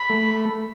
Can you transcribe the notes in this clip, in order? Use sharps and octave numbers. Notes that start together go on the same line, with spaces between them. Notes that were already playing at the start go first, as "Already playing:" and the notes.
Already playing: B5
A3